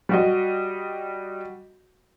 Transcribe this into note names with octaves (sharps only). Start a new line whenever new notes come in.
G3 F#4 D#5